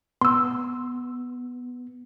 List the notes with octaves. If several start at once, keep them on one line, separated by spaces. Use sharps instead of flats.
B3 C6 E6